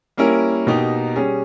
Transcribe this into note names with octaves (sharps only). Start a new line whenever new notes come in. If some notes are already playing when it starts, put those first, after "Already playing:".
G3 A#3 C#4 E4 A#4
B2 A#3 D#4 G4
G3 C#4 G#4